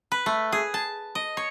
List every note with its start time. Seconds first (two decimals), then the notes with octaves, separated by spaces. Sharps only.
0.12 B4
0.26 A3
0.52 G#4
0.74 A5
1.15 D#5
1.37 C#5